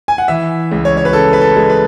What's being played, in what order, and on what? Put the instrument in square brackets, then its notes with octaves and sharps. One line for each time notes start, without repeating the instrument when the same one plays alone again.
[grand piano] G#5
F#5
E3 E5
C#2
C#5
C#5
B4
C#3 A4
B4
A4
G#3
B4